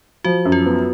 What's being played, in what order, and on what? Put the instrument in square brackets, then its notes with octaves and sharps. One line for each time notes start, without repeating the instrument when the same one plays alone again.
[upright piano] F3 [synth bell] F#4
[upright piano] F#2
[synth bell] F4
[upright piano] B3